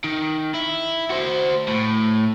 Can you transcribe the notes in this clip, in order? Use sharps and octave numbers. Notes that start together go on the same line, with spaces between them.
D#3
E4
F#4 C5
A2